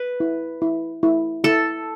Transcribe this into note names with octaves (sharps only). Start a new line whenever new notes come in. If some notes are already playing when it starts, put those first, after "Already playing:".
Already playing: B4
E4
E4
E4
E4 A4